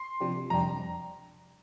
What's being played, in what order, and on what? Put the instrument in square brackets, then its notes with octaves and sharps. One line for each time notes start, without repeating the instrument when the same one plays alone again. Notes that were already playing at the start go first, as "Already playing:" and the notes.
Already playing: [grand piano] C6
[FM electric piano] C3 F3 D4 G4
[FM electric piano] F2 C3 G3 D4 G4 [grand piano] A#5